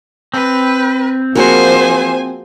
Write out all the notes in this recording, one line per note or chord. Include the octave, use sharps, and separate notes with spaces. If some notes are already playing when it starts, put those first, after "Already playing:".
C4 B4
F3 A#3 F#4 G#4 C5 G#5